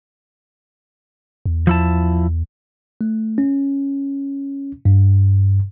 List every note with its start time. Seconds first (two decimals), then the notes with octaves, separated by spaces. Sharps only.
1.46 E2
1.67 F3 E4 A5
3.01 A3
3.38 C#4
4.85 G2